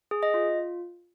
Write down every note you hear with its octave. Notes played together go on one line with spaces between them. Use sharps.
G#4
D#5
F4